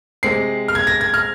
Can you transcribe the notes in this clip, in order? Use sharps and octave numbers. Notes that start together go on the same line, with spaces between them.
C3 G#3 C4 C7
F6
G#6
A#6
G#6
F6